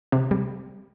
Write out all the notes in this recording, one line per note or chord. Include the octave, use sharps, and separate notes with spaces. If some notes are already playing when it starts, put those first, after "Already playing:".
C3
G3